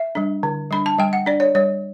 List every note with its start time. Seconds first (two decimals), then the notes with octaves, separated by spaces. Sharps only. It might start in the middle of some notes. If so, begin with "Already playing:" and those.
Already playing: E5
0.15 G3 D4
0.43 D3
0.71 G3 D4 B5
0.86 A5
0.99 G3 G5
1.13 F#5
1.26 D4 D5
1.40 C#5
1.55 G3 C#5